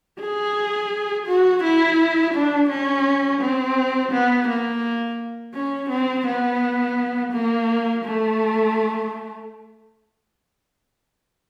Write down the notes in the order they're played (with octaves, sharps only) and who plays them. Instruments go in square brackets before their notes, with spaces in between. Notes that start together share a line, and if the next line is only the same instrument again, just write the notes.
[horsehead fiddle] G#4
F#4
E4
D4
C#4
C4
B3
A#3
C#4
C4
B3
A#3
A3